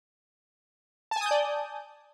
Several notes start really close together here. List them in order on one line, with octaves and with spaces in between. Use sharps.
A5 G#5 D#6 G6 D5